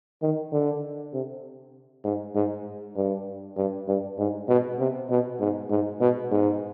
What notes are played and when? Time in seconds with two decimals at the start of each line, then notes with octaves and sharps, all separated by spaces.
0.22 D#3
0.52 D3
1.13 C3
2.04 G#2
2.35 G#2
2.97 G2
3.57 G2
3.88 G2
4.18 G#2
4.48 B2
4.79 C3
5.10 B2
5.40 G#2
5.71 G#2
6.01 B2
6.32 G#2